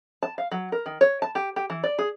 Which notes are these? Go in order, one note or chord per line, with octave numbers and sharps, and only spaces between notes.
A5
F5
F#3
A#4
D#3
C#5
A5
G4
G4
E3
D5
G#4